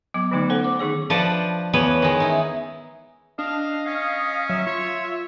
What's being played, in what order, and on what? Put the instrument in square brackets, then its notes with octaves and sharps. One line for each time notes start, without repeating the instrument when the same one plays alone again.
[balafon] F#3 B3 D6
D3 E3 F#3 A3 B3 D#4
B3 C#4 A4 C5 F#5
D6
D#3 D#4 G#4 C#5
[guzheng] F3 D4 B4 D5 F#5 A5
E2 B3 B4 C#5
D#3 G#3
D#4 E4
[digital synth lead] D4 [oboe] D#5 [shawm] F5
[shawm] C#4 [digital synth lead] F5
[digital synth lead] F#3 [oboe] E5
[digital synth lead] F4 [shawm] C#5